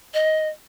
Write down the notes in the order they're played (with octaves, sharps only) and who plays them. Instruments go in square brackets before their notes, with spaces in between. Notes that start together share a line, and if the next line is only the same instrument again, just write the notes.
[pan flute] D#5